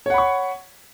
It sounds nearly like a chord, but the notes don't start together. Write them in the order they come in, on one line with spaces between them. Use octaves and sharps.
C#5 F#5 B5 C#6